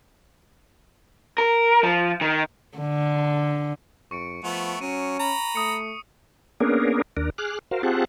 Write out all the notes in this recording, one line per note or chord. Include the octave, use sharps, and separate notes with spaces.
A#4
F3
D#3
D3
F2 C#6 C#7 D7
F3 A3 B3
F#3 C#4 D#7
A#5 B5
A3 D#6 C#7
A#3 B3 C#4 D4 G#4 A#4
D#2 D4 A#4
G#4 D6 F6 F#6
F#4 A#4 C5 F5
C4 F4 G4 G#4 F#5 A5